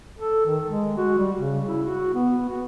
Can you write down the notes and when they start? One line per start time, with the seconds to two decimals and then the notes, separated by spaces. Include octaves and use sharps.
0.19 A4
0.46 D#3
0.66 G#3
0.97 F#4
1.18 G3
1.37 C#3
1.67 E4
1.84 F#4
2.14 B3
2.49 F#4